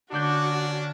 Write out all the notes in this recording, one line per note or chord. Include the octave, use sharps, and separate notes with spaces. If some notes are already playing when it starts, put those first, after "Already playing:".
D3 A#3 C#4 D4 F#4 D5 G6